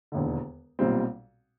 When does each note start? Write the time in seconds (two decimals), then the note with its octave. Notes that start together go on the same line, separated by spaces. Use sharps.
0.12 E1 D#2 D3
0.79 B1 A#2 G3 C4